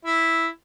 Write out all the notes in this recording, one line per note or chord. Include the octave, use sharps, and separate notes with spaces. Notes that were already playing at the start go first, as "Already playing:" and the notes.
E4